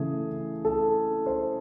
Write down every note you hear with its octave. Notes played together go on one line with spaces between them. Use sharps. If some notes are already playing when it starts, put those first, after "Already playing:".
Already playing: C#3 E3 A3 G#4
A4
C5